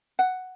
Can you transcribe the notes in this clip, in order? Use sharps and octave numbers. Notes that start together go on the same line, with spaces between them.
F#5